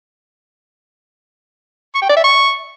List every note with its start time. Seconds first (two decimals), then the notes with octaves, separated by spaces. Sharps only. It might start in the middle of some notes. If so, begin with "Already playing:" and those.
1.95 C#6
2.02 G5
2.09 D5
2.17 E5
2.24 C#6